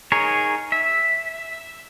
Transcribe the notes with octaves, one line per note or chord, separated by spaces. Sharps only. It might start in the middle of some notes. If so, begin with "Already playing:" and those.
D#4 G#4 A#4 C#5
E5